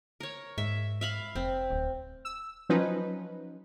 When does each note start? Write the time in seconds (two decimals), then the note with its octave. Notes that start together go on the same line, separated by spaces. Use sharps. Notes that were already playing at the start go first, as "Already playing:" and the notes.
0.20 A#4 C#5
0.58 G#2 E5
1.01 E5 F5 B5
1.35 F1 C4
1.71 D1
2.25 E6
2.69 F3 F#3 C#4 D#4 B4